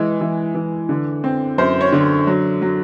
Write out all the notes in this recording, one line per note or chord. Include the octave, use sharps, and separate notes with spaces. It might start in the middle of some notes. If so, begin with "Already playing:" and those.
Already playing: E3 G#3
E3
E3
D3
C4
F#2 C5
C#5
D3
F#3
F#3